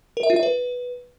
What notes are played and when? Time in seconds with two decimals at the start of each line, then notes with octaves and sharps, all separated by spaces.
0.17 A#4
0.23 E5
0.30 F4
0.36 E5
0.43 B4